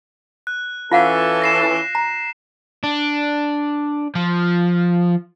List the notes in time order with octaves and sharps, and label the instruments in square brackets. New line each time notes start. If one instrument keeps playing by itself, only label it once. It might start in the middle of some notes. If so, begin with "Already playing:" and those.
[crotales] F#6
[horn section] E3 C#4 A4 [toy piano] F4 F5 F#5
[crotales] A#6 C7 E7
[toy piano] A#5
[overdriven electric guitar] D4
F3